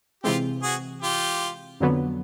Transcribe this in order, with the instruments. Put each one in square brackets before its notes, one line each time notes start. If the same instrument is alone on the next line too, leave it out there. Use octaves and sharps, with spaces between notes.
[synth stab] C3 E3 G#3 C4 [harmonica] F4 G4
[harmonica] F#4 G#4
F4 G4
[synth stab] F2 D3 F#3 B3